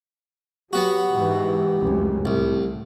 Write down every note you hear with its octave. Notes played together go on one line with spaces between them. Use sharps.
F#3 B3 F#4 G4
G#2 E3
F1 C#2 F#2
C2 A2